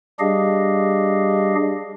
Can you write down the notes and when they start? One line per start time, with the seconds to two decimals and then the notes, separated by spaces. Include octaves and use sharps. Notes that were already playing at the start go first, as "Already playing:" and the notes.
0.20 G3 D4 G4 G#4 D#5 F5